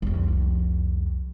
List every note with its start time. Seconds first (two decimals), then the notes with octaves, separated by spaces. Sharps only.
0.02 C2 F2